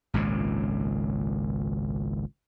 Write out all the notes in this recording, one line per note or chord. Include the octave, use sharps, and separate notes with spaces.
G#1 C#2 A#2 C#3